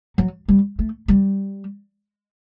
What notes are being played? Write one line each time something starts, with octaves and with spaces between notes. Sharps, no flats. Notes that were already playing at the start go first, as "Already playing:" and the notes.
F#3
G3
A3
G3